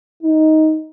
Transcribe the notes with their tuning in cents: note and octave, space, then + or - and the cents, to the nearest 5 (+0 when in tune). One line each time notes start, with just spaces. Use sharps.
D#4 +10